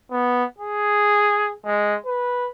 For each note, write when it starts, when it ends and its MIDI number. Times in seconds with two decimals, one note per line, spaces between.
0.11 0.44 59
0.58 1.52 68
1.66 1.97 56
2.06 2.50 71